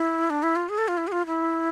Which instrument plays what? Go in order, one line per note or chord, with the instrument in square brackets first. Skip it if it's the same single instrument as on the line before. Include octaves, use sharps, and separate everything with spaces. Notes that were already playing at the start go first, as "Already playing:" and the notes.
Already playing: [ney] E4
D4
E4
F4
G#4
A4
F4
E4
G#4
F4
E4